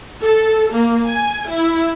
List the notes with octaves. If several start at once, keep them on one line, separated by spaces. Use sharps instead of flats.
A4
A#3
G#5
E4